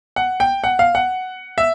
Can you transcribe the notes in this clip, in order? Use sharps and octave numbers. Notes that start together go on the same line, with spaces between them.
F#5
G5
F#5
F5
F#5
E5